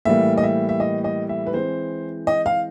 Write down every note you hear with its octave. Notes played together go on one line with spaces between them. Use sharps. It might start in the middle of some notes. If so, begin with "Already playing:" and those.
A2 E3 G3 A#3 E5
D#5
E5
E5
D#5
D#5
E5
B4
E3 G#3 C4 C5
D#5
F5